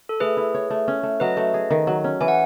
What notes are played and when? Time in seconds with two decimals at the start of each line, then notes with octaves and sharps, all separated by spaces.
0.09 A4
0.20 A3 G#4 B4
0.37 E4
0.54 C#5
0.70 A3
0.88 C#4
1.03 A3
1.20 F#3 B4 D#5
1.37 A3
1.54 G#4
1.71 D#3
1.87 F#3
2.04 C#4
2.21 E3 G#5
2.28 F#5